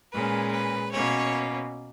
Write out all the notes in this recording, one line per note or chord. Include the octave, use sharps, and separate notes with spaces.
A#2 G#3 C#4 B4
B4
B2 A#3 C#4 C#5